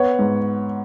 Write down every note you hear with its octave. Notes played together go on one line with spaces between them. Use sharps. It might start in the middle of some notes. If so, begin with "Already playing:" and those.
Already playing: B3 C#5 F#5
G#2